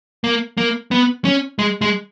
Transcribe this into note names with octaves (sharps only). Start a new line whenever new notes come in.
A#3
A#3
B3
C#4
G#3
G#3